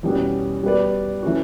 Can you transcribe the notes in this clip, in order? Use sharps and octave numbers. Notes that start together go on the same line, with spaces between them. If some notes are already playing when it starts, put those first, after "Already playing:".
E2 B2 G3 C#4 F#4
G3 B3 F#4 B4 D5
E3 A3 C#4 F#4